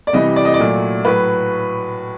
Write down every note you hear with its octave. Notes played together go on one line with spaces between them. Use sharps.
D5
C3 E3 G3 D#5
D5
D#5
D5
A#2 F#3 A3
A2 F#3 B4